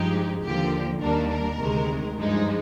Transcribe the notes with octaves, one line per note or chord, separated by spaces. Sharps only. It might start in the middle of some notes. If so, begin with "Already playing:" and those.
Already playing: G2 F3 G#3 D#4 G4
D#2 D3 F3 A#3 G4
D#2 D#3 G3 A#3 D4 A#4
A#4
D2 C3 D#3 G#3
G2 F3 G#3 D#4